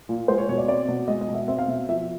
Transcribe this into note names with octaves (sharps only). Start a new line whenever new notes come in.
A#2
G#3 C5
C#5
B2 C#5
D5
C4 D5
B2
G#3 D#5
D#5
B2
E5
C4 E5
F5
B2 E5
F3 E5